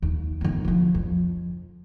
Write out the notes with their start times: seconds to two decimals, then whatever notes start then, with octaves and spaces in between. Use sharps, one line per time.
0.02 D#2
0.41 D#3 B3
0.65 D3 F3
0.95 F2